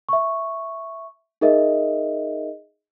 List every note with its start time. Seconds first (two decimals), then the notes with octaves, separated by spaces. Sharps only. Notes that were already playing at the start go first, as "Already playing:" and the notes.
0.09 E5 C#6
1.41 D#4 G#4 A#4 D#5 E5